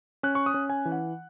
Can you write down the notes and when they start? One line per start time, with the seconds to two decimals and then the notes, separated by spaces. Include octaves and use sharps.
0.23 C#4 F#6
0.35 C#6
0.46 D#6
0.54 C#4
0.70 G#5
0.85 E3
0.92 F#5